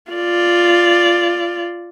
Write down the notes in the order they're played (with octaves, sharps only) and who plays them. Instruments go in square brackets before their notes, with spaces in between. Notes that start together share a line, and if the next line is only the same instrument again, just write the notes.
[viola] F4 D5